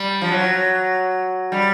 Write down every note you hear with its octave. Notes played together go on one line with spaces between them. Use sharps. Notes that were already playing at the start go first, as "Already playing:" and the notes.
Already playing: G3
F3
F#3
G3